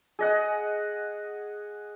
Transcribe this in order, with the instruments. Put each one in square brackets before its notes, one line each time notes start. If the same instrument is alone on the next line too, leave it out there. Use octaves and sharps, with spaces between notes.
[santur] G#4 D#5 F#5